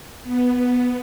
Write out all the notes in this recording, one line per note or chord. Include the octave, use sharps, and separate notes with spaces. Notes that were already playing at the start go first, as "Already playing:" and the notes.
B3